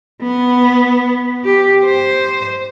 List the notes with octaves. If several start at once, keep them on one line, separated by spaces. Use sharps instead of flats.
B3
G4
C5